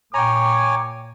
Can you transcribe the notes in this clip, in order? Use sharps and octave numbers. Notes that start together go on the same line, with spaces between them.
A#2 C#5 G5 G#5 A#5 D6